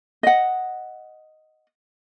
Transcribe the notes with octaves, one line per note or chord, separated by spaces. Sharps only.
D#5 F#5